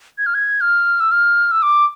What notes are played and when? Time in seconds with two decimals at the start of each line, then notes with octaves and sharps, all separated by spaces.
0.18 G#6
0.26 F6
0.35 G#6
0.61 F6
1.00 E6
1.11 F6
1.51 E6
1.62 D6